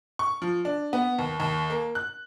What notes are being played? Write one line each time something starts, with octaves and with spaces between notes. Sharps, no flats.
C#6
F3
D4
B3
D#2
D#2
A#3
F#6